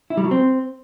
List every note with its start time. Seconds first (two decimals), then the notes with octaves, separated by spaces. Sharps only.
0.10 E4
0.17 G3
0.24 F#3
0.31 C4